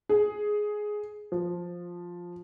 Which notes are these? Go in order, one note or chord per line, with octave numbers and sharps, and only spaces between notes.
G#4
F3